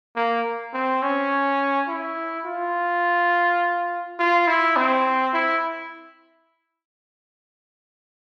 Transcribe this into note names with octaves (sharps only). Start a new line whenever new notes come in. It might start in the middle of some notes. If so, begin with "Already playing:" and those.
A#3
C4
C#4
E4
F4
F4
E4
C4
E4